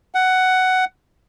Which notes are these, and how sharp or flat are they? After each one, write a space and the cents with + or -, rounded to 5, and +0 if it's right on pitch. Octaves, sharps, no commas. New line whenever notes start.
F#5 +10